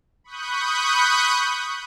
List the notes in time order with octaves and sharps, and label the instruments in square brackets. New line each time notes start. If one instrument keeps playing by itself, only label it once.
[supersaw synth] B5 C#6 D#6 F#6 G6